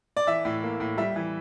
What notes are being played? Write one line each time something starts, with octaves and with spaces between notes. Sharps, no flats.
D5
E3 E5
A2
A#3
A2
G3 E5
E3